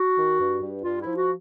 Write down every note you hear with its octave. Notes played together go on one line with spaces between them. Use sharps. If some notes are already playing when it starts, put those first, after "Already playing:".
Already playing: F#4
D#3
G2
G2
G2 F4
F3 E4
F#4